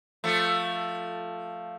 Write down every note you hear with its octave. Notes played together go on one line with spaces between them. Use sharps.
F3 A3